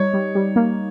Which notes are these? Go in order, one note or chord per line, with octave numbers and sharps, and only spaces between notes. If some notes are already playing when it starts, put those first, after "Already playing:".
Already playing: G3 D#4 C#5
G3
G3
A#3